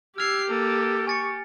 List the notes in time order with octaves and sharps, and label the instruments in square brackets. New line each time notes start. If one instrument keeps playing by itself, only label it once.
[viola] G4 [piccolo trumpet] E6 [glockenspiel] F6 F7 [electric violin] G#6 C7
[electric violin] A#3 [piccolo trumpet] A4
[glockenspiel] G#5 A6 C#7 [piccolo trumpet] C#6